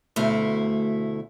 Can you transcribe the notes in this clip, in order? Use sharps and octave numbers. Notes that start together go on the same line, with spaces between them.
D2 B2 A3 E4 F5